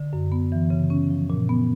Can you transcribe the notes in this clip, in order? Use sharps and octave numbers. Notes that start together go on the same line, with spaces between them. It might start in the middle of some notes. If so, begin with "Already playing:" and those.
Already playing: D3
F#2
B3
E3
C#3
C#4
F3
A#2
B3